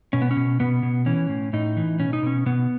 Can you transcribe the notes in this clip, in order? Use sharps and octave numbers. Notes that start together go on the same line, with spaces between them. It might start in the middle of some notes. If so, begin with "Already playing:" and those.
B2 C#4
B3
C#4
B2
B2 B3
B2
E3 C#4
A2
A2 D#4
E3
B2 C#4
D#4
B2 C#4
B2 B3